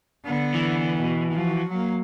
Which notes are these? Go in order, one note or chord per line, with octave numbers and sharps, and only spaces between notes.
D3 B3
E3
B2
F3 F#4
F#3 A#3